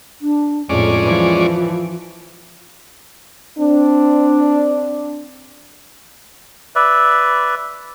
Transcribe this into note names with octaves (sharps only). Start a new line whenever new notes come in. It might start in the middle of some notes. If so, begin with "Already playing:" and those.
D4
F2 A2 G#3 C#4 F4 D5
E3 F3
C4 D4
B4 D5 E5